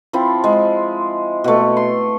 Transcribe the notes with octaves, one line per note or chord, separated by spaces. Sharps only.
F3 C4 E4
G#3
B2 A3
C6